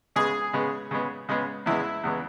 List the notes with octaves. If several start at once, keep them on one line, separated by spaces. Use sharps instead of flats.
C#3 G#3 B3 G#4
C#3 G#3 B3
C#3 G#3 B3
C#3 G#3 B3
E2 C#3 G#3 B3 E4
E2 C#3 G#3 B3